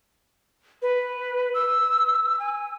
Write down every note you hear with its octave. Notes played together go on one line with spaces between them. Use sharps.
B4
E6
G#5